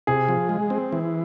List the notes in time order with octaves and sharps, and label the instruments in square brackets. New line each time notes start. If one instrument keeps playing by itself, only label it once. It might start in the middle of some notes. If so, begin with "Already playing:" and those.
[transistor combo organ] C3 [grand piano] G#4
[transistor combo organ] F3
G#3
C4
E3